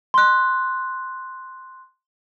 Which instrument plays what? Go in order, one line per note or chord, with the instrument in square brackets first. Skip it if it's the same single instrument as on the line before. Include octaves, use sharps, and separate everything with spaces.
[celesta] C6 F#6